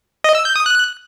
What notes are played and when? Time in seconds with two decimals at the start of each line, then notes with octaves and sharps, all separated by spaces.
0.24 D#5
0.35 E6
0.45 G6
0.56 D#6
0.66 F#6